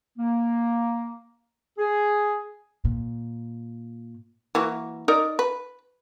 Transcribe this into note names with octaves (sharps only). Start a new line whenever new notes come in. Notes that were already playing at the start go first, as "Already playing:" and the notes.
A#3
G#4
A#2
E3 A#3 F#4
D#4 A#4 D5
B4